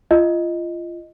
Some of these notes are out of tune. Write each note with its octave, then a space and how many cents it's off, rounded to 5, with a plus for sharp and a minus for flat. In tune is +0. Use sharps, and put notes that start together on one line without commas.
F4 -25 D#5 +0